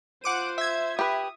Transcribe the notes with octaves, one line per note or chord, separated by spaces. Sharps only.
F4 C5 F#5 D6 D#7
E5 G#6
G4 B4 D#6